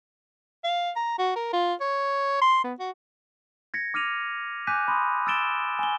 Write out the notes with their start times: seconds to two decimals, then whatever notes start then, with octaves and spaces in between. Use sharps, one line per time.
0.64 F5
0.96 A#5
1.18 F#4
1.36 A#4
1.53 F4
1.81 C#5
2.42 C6
2.64 B3
2.79 F#4
3.74 G#6 A#6 B6 C#7
3.94 D6 F6 A#6 D#7 F7
4.67 G#5 D6 F#6 G6 B6 D#7
4.88 B5 C6 D#6
5.27 E6 F6 A6 D7 E7 G7
5.79 G#5 G7